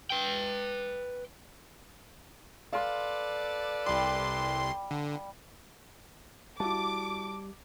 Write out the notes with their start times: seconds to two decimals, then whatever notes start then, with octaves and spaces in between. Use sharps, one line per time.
0.10 B4 G5
2.73 A4 B4 D5 F5 C6
3.86 C2 G3 C6
4.91 D3
6.60 G3 E4 F#4 A5 D6